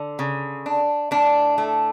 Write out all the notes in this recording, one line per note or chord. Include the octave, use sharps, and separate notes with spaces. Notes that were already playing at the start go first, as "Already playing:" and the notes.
Already playing: D3
C#3
D4
A2 D4
A3